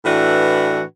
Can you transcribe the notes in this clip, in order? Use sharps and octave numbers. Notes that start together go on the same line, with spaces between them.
A2 E3 D4 F#4 B4